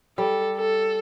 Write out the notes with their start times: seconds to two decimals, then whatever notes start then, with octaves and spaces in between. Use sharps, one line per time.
0.18 G3 A4
0.57 A4